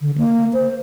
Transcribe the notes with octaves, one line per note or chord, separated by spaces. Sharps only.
D3
A#3
C5